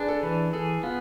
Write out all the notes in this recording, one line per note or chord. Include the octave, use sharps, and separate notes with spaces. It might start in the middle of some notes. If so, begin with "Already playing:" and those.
Already playing: D4 G#4 B4
A4
E3 B4
G#4 A4
B3 F4